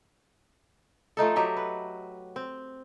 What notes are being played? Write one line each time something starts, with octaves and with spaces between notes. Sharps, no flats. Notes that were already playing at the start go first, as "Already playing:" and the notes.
F3 A3 D#4 A4
F#3 G4 D#5 E5
B4
C4